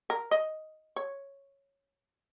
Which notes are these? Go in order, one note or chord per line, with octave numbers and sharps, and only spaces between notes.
A#4
D#5
C#5